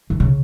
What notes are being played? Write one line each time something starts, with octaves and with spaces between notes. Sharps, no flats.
E3
C#3